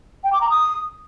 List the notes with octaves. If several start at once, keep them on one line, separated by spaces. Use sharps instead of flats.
G5
D6
A#5
D#6